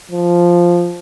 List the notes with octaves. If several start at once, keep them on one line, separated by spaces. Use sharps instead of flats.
F3